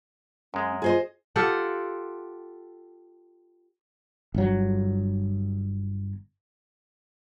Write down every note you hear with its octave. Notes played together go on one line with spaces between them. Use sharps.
F#2 G#3 C#4
F4 G#4 C5 D#5
F4 G4 A4 F#5
G1 F#3